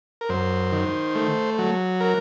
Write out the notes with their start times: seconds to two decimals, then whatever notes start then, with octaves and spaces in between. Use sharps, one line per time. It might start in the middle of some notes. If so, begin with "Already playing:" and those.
0.21 A#4
0.29 F#2 C5
0.72 D#3
1.15 A3
1.58 F#3
2.00 A#4